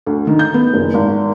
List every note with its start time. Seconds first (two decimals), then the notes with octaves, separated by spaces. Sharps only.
0.06 D2
0.27 D#3
0.39 G6
0.54 B3
0.74 F#1
0.94 G#1